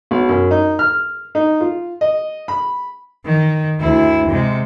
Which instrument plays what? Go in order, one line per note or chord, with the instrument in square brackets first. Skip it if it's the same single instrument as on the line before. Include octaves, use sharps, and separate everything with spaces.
[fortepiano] B1
F#2
D#4
F6
D#4
F4
D#5
B5
[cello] D#3
D2 E4
C3 G#3